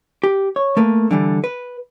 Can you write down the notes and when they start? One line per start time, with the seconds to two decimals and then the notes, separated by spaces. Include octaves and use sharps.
0.23 G4
0.56 C#5
0.77 A3 A#3 B4
1.11 D3 E3 G3
1.44 B4